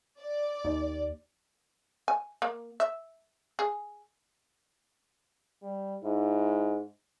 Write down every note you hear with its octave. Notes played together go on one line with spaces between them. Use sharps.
D5
D#2
G#5
A#3
E5
G#4
G3
G#2 E4